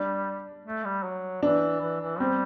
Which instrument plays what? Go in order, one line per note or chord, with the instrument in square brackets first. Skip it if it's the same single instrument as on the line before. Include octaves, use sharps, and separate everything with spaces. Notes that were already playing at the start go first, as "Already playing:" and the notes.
Already playing: [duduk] G3 [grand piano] D4
[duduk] A3
G3
F#3
[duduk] E3 [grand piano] D4
[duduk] E3
E3
[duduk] G3 [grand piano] C4